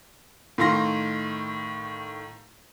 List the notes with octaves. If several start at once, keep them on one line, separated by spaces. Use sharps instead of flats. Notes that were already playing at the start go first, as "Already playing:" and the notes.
A2 D#3 F5 C6 A#6